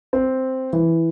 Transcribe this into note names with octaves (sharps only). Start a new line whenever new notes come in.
C4
E3